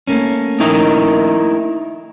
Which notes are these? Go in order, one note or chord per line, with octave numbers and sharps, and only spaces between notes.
A3 A#3 C#4
D#4 E4 A#4